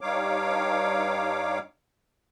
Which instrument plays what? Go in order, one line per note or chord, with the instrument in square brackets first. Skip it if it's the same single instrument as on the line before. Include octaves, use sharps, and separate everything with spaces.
[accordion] G2 G3 D#4 C#5 F5 D6